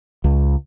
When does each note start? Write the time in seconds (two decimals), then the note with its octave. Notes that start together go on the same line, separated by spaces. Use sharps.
0.24 C#2